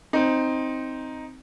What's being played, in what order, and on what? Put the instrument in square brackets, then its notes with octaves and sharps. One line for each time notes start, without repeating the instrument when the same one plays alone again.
[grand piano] C4 D#4